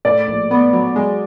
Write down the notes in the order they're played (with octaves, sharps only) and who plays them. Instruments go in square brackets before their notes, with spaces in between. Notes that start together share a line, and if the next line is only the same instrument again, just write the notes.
[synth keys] A2 [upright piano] D5
[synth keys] A#1
B3
F#3
G#3